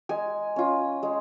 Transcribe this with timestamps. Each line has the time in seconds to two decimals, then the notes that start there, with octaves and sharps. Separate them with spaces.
0.09 G#3 G#5
0.56 C#4 F4
1.03 G#3